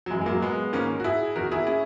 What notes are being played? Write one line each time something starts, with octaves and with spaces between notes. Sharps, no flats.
F#3
F#2 E3 G#3
G#3
F#3 A#3
G#3 B3
G#2 D#3 A#3 C#4
F#4
E4 G#4
E2 D#3 F#4 A#4
E4 G#4
C#4 E4